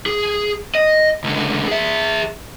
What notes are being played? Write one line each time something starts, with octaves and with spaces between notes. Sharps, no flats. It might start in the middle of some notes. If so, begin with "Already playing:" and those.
G#4
D#5
C#2 D3
G#4 E5